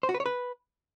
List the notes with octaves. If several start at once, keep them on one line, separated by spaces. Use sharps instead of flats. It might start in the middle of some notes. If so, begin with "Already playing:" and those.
C5
F#4
B4
C#5
B4